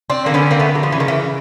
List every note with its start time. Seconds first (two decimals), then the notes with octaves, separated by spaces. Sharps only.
0.10 C4 D4
0.26 D3 A#3 C4
0.34 B3 C#4
0.51 A#3 C4
0.60 A3 B3
0.75 F#3
0.83 F3
0.92 C#3 E3
1.00 D#3
1.08 E3